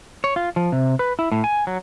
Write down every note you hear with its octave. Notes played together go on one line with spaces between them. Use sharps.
C#5
F4
F3
C3
B4
E4
A2
G#5
F#3